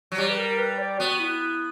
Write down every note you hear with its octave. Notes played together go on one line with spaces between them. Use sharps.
F#3
G3 G4
B4
A#4
B4
D5
B3 F#4
E4